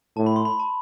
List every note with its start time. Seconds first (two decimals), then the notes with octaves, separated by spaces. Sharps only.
0.17 A2 A5
0.26 B5
0.36 C6
0.45 B5
0.60 A5